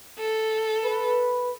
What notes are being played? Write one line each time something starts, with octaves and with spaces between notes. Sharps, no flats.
A4
B4